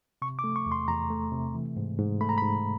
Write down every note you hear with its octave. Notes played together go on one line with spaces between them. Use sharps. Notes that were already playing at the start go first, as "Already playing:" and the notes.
C3 C#6
D6
A3
C#6
E2
C6
E2 A#5
A3
C3
E3
G#2
G#2
A3 B5
A#5
G#2 B5